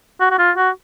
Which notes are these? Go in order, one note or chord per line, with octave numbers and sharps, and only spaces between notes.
F#4
F#4
F4
F#4